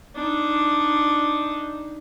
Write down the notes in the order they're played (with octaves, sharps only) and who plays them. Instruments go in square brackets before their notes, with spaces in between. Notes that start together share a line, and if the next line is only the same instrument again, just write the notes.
[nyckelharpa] D4 D#4